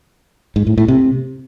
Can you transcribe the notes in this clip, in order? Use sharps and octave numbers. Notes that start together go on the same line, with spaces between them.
G#2
A2
A2
C3